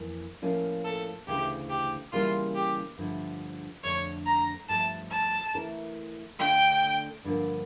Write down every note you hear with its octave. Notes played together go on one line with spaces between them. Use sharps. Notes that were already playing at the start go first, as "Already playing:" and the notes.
Already playing: F2 E3 A#3
A2 F3 A#3 C#4 F4
A4
D2 C#3 E3 A3 G4
G4
C#3 E3 G3 A#3 C#4 F4
G4
G2 D3 F3 A3
F2 D3 A3 D4 A4 C#5
A#5
G2 F3 A3 A5
A5
E3 A3 E4 A#4
D3 A3 D4 F4 G5
G2 D3 F3 A#3